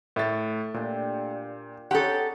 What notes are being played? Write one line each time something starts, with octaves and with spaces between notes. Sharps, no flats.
A2 A3 A6
A#2 D4 G4
C4 C#4 D#4 G4 A4 F#5